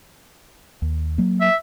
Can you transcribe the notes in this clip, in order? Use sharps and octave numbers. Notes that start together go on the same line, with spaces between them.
D#2
F#3 A#3
E5